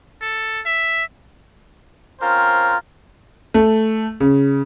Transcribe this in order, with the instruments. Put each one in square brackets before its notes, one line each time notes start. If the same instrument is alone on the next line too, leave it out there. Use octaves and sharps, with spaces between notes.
[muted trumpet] A4
E5
[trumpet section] C4 C#4 F4 A#4 C5
[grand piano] A3
C#3